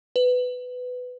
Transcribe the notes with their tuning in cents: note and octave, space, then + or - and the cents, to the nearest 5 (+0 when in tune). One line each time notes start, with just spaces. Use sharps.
B4 +15